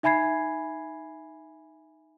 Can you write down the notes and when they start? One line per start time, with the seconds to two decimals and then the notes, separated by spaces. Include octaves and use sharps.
0.03 D#4 E5 G#5 B5 G#6 C7